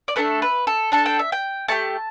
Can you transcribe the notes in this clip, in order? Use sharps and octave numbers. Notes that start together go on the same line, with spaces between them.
D5
A3 D4 A4 B4
B4
A4
D4 A4 A5
G5
E5
G5
A3 G4 A5